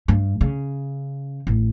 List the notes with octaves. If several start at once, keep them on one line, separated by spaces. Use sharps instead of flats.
G2
C#3
A1